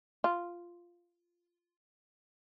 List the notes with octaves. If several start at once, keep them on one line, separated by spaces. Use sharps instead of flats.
F4